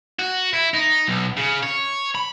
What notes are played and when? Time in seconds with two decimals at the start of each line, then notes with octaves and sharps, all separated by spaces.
0.19 F#4
0.53 E4
0.74 D#4
1.08 B1
1.37 C#3
1.63 C#5
2.15 B5